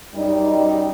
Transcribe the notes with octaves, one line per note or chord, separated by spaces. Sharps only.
F#2 G3 D#4